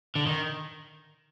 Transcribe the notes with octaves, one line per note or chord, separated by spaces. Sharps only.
D3
D#3